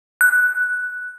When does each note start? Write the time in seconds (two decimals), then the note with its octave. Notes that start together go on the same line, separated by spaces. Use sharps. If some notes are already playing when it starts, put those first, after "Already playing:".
0.21 F#6